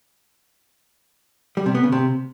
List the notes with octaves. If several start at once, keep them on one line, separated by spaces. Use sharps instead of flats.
G3
C3
B3
C#3
C3